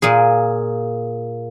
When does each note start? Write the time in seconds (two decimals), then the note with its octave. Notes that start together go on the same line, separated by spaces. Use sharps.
0.02 A#2 A#3 G#4